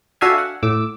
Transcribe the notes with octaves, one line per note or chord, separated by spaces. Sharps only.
D4 F#4 A4 E5 F5 G#5
F#5
A2 D6 E6